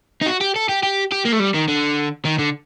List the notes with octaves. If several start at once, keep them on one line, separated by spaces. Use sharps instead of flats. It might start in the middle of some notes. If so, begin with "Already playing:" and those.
D#4
F#4
G4
A4
G4
G4
G4
A#3
A3
G3
D#3
D3
D#3
D3